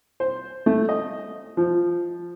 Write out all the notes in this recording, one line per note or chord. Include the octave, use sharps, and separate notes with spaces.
C5
A3
D#5
F3